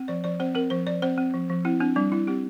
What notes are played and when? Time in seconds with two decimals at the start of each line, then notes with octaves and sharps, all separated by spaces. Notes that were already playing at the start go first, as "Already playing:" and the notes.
Already playing: C4
0.08 F3 D5
0.24 F3 D5
0.40 C4 C5
0.55 C4 A#4
0.70 F3 C5
0.87 F3 D5
1.02 C4 C5
1.18 C4
1.34 F3
1.50 F3
1.65 C4 E4
1.80 C4 D4
1.96 G3 D4
2.12 G3 E4
2.27 C4 G4